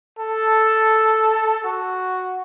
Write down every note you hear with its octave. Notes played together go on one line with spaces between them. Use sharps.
A4
F#4